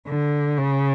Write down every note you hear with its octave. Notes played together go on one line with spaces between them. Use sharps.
D3
C#3